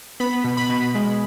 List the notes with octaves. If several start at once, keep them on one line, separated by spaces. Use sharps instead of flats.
B3 B5
B2
B5
B2
G#3